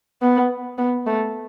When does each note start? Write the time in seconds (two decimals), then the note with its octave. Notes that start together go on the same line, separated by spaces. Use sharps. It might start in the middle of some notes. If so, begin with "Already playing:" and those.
0.22 B3
0.78 B3
1.07 A3